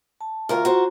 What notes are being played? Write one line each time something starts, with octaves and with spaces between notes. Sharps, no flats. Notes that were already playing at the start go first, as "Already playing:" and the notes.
A5
D2 F4 A#4 F5 A#5
F#4 C5